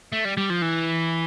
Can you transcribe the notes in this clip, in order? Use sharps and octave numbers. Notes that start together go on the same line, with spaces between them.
A3
G3
G3
F3
E3